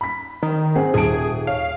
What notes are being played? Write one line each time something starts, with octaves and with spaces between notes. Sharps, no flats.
B5 B6
D#3
C4 G#4 F#5
D#1 G#4 A5 D7
C#5 F5